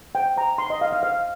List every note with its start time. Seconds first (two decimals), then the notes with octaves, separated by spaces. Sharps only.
0.15 C5 G5
0.37 C5 A#5
0.58 D#4 C6
0.70 D#5
0.81 D#4 F5
0.92 F5
1.03 C5 F5